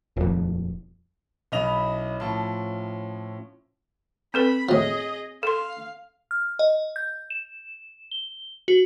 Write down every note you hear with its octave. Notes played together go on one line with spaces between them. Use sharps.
D#1 F2
B1 C#4 E4 D#5 B5 F7
A2 F3 A5
C4 A4 B4 B5
A2 F3 G#4 D#5
A4 F5 C6
F6
D#5
G6
E7
G7
F#4